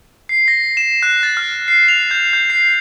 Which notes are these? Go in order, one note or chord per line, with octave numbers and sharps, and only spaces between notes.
C7
A#6
E7
F#6
A6
F6
C7
F7
G6
G6
C7